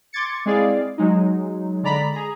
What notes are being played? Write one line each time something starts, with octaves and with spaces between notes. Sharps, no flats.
C6 D6 G#6 A6 C#7
G#3 C4 E4 G#4 D5 F5
F#3 G#3 D#4
D3 G#3 D5 A#5 B5 B6
G#4 A#5